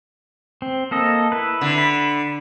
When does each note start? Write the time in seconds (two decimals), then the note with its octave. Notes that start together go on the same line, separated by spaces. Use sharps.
0.62 C4
0.91 A#3 A4 D#5
1.32 E4 B4
1.61 D3
1.78 B5